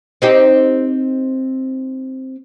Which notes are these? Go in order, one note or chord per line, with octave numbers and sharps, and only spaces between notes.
C4 D#4 G4